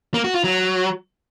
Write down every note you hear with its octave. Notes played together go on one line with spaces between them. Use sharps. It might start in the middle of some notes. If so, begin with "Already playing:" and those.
A#3
F#4
F4
F#3